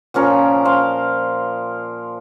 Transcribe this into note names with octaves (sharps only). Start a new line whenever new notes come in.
A#2 F3 C#4 A#4
C5 F5